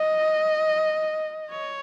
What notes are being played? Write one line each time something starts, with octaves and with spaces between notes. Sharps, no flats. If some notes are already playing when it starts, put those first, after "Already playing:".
Already playing: D#5
C#5